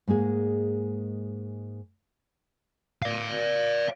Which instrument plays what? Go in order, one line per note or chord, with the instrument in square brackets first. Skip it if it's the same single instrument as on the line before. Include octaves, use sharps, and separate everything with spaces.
[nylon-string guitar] G#2 G#3 A#3 G#4
[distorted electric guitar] D5 F5